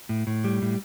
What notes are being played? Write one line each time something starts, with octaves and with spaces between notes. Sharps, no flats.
A2
A2
G3
A2